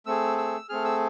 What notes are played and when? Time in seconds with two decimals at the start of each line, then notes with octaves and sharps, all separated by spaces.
0.06 A3 C4 G#4 E6
0.38 E6
0.69 A3 C4 G#4 F6
0.85 E6